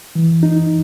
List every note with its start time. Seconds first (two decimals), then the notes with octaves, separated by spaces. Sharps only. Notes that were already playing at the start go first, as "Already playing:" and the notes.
0.15 E3
0.43 D#4